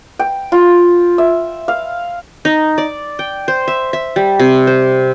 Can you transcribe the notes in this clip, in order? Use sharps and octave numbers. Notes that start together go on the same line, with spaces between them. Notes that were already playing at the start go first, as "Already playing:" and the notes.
G5
F4
E5
F5
D#4
D5
G5
C5
E5
E5
G3
C3
C5